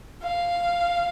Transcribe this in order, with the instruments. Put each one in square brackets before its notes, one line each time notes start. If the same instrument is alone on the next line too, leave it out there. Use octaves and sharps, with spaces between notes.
[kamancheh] F5